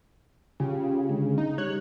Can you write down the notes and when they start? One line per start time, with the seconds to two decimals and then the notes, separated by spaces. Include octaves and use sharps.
0.60 C#3 F4 G4
1.09 D3 G#3
1.38 D#4
1.58 G3 C#5 F#6